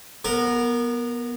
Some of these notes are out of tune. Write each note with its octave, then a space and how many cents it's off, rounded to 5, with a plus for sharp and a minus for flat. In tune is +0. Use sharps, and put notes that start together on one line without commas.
B3 -20 A#4 +0